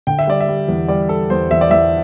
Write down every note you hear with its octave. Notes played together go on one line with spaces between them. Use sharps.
D3 G5
E5
G3 D5
E5
G3
E2
G3 D5
G3 A4
E2 C5
E2 E5
D5
E2 E5